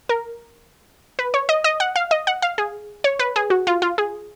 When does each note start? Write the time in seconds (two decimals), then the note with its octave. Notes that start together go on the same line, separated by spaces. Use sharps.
0.09 A#4
1.19 B4
1.34 C#5
1.49 D#5
1.64 D#5
1.80 F#5
1.96 F5
2.11 D#5
2.27 F#5
2.42 F5
2.58 G#4
3.04 C#5
3.19 B4
3.36 G#4
3.50 F#4
3.67 F4
3.82 F4
3.98 G#4